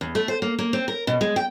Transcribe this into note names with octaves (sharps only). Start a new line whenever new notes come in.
E2
A3
C5
A#3
A#3
C4
A#4
B2
G#3
G5